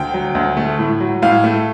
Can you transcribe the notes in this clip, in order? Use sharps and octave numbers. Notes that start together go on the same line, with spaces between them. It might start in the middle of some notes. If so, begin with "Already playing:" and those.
Already playing: D2 G5
F#3
D2
A3
A2
F#3
A2 F5
A3